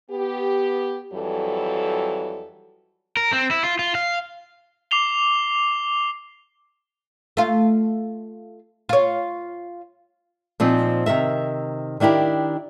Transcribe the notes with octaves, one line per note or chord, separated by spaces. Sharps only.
B3 G4
F2 E3 F#3 G3 A4
A#4
C4
E4
F4
F4
F5
D6 C7 F7 G7
A3 F4
F4 C#5
A#2 F3 C4 D#4
C3 D#3 A#4 E5
D#3 D4 E4 G4 A#4